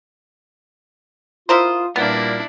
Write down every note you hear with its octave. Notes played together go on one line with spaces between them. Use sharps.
E4 F4 A#4 C5 D#6
A#2 G3 A#3 B3 D4 E4